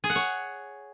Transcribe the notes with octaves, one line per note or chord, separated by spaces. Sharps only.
G#4
F#5
C#5